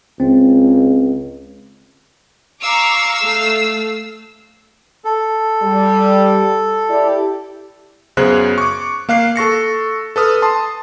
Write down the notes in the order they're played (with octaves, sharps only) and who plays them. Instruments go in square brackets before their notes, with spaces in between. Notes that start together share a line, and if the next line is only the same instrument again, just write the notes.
[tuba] C#2 [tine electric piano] C4
[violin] F5 E6 [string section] A#5 C#6 D6
[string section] A3
[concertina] A4
[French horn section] G3
E4 G4 D5
[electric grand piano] F#2 C#3 B3 G#4 C5 F#6
C#6 D6
A#3 F5 F#6 C7
A4 C#6 A#6 C#7
A4 B4 D#6 F6
A5 C6 D#6